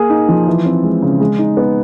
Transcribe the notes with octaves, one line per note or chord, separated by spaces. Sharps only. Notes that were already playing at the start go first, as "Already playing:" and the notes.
Already playing: A#3 G#4
D#4
F3
E3
C4
G#3
C#3
G#3
D#4
B3